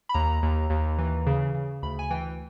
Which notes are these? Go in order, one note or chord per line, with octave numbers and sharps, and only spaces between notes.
B5
D#2 A#5
D#2
D#2
E3
C#3
C#3
D2 B5
G#5
E3 G5